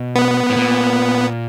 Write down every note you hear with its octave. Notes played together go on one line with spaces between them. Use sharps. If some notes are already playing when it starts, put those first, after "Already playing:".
Already playing: B2
B3
A2
A#2